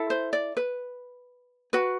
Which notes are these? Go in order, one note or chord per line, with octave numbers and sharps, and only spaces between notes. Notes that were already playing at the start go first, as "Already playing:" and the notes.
Already playing: E4 A4
C5
D5
B4
F#4 B4